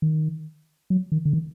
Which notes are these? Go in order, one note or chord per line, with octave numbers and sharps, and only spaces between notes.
D#3
F#3
D#3
D3
D#3